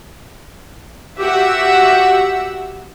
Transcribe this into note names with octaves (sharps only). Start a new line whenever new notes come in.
F#4 G4 E5 F#5 E6